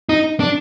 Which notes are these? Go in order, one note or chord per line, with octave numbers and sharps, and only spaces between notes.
D#4
D4